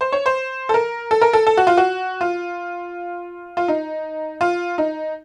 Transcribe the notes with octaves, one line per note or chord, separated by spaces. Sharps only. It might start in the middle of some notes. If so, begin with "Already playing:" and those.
C5
C#5
C5
A4
A#4
A4
A#4
A4
A4
F#4
F4
F#4
F4
F4
D#4
F4
D#4